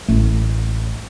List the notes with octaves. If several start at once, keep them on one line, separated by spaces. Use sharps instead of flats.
A1 A3